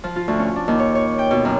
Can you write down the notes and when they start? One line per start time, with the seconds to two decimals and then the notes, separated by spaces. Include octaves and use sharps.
0.04 F3
0.16 F4
0.28 D2
0.39 C#4
0.56 D4
0.68 D#2
0.79 C#5
0.95 C#5
1.19 G5
1.31 B2
1.45 F#2